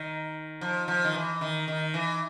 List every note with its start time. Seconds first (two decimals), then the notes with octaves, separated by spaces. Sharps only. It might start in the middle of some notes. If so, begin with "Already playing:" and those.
Already playing: D#3
0.61 F3
0.88 F3
1.04 D#3
1.14 E3
1.41 D#3
1.68 D#3
1.94 E3